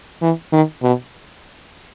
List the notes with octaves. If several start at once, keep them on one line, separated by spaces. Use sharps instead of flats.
E3
D#3
B2